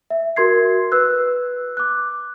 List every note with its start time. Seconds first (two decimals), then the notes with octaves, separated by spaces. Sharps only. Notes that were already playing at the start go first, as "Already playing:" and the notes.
0.10 E5
0.36 F#4 A#4 C6 G#6 C7
0.92 B4 E6 F#6
1.77 D6 F#6